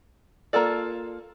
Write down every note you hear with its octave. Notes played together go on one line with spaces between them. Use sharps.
A#3 F4 A4 D5